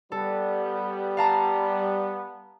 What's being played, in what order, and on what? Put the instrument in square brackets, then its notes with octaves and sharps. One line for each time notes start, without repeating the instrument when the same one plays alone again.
[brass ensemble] G3 B3 [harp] A4
[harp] F5 A5 A#5